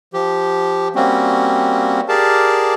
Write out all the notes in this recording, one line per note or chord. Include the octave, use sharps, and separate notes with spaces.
F3 G4
G3 A#3 C4 C#4 F#4
G4 G#4 A#4 D5 F5 A5